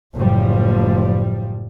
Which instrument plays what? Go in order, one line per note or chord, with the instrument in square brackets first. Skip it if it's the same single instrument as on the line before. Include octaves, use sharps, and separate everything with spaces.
[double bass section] F#1 A2 F3 G3